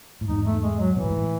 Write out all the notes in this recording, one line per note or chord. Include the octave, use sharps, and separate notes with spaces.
A2
E2 G#2 D#4
A3
G#3
F#3
B2 E3
A2
G#2
A2